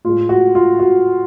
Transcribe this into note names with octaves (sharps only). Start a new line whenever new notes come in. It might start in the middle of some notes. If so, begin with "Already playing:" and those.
A2 G#3 F4
F#4
F4
F#4